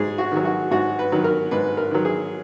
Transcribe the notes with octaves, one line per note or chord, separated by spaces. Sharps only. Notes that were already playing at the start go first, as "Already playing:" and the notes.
Already playing: G#2 G#4
F#4
D#3 F#3
F#4
G#2 F#4
B4
D#3 F#3
A#4
G#2 B4
A#4
D#3 F#3
G#4